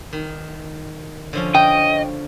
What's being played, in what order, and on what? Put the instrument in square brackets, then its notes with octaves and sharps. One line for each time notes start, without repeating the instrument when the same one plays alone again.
[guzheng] D#3
D3 F3 C#4
[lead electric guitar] D#5 [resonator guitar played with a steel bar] G5